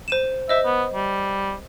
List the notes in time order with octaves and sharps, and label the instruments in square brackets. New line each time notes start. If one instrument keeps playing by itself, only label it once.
[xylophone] C5 D#7 E7
[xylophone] C5 D#5 [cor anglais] E5
[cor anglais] B3
G3